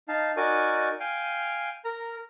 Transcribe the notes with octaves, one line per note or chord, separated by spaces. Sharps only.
D#4 F5 A5
D#4 F#4 A#4 D5 G#5
F5 G5 G#5
A#4 A#5